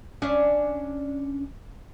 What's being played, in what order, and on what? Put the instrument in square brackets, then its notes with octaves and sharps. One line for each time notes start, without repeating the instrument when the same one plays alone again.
[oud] C#4 D4 E5